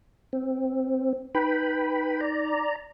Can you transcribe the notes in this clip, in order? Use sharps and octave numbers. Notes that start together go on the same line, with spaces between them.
C4
D#4 B4 G5 B5
D5 A#5